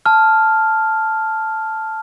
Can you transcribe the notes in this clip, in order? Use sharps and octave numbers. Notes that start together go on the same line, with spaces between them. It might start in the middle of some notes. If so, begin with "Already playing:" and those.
A5 F6